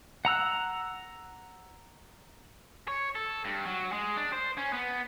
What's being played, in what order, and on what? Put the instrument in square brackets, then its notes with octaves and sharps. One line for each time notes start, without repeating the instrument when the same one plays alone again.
[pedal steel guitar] F#5 A#5 E6 F#6
[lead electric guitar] C#5
A4
G2
F#3
G#3
D4
C5
C#4
B3